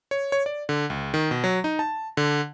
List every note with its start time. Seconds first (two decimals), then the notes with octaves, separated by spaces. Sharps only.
0.11 C#5
0.32 C#5
0.46 D5
0.69 D3
0.90 C#2
1.14 D#3
1.31 B2
1.44 F#3
1.64 D#4
1.79 A5
2.17 D3